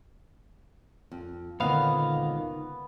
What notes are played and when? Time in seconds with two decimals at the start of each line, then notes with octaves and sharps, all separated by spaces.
1.12 F2
1.60 C#2 A#2 D3 D#3 B3 C4 F5